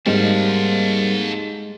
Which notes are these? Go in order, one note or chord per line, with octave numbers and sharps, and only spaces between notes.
G#2 G3 A#3 C4 A4 F5